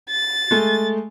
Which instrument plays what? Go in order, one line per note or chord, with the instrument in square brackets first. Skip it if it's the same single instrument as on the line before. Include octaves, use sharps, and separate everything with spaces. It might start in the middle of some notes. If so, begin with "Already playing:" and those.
[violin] A6
[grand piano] G#3 A3